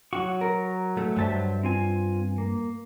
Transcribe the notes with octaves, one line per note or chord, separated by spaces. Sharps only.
F#3 F#4 C#6
A#4
A3
G2 F#3 C5 E5 A5
C4 F4 G#5
A#3